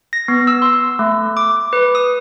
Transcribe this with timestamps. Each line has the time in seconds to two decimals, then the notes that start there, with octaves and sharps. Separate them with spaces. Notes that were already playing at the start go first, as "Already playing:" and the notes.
0.13 A#6
0.28 B3
0.47 E6
0.62 C6
0.99 A3
1.37 D6
1.73 B4
1.95 D#6